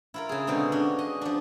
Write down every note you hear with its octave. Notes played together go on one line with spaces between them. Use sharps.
E4 F4 A#4
C#3 G#4
B2 D3 G#3 C4 D#4 G#4
C#4 D4 F#4
D#5
F3 D4